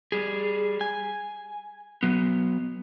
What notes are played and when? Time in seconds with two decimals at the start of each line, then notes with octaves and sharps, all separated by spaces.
0.12 G3 G#4
0.81 G#5
2.03 F#3 B3